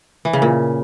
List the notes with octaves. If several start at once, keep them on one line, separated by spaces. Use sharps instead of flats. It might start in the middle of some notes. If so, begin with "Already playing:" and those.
E3
C#3
A#2